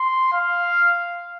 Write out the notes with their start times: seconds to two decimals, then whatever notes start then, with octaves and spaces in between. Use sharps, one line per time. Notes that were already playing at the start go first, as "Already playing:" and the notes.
Already playing: C6
0.33 F5